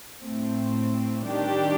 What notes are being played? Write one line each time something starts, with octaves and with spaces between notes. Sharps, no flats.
A2 A3 C4
D#3 G3 D4 G4